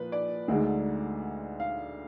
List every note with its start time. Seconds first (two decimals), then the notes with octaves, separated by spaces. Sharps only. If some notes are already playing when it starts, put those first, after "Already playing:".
Already playing: A#2 F3 B4
0.12 D5
0.48 D2 D3 G#3 D#4
1.60 F5